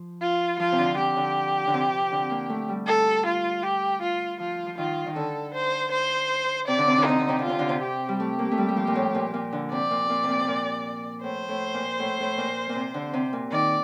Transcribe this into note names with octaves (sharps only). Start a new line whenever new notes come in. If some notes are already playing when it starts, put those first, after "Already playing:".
Already playing: F3
F4
F3 F4
C3
D3
F3 G4
D3
D3
C3
D3
A#3
A3
G3
A4
F4
G4
F4
F3 F4
F3
D#3 F4
D#3
D3 A4
C5
C5
C3 D5
D3
C3
D3
C3 D#4
D3
C3
D3
F4
C3
D3
C3
G4
G3
A3 G4
A#3
A3
G3
G3
F3
A#2
A2
A#2
A#2
D3
C3 D5
A#2
A#2
C3
A#2
C3
A#2
A2 C5
A2
A#2
A2
A2
A#2
A#2
C3
D3
C3
A#2
D#3 D5